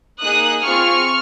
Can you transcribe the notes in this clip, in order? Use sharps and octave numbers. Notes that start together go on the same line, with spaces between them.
A#3 D#4 G#4 D#6 F#6
C4 F4 G#4 C#6 F6